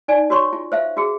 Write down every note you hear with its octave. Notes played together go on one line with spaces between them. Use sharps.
D#4 D5 G#5
F#4 C#5 C6 C#6
F4
C5 E5 F5
F#4 G#4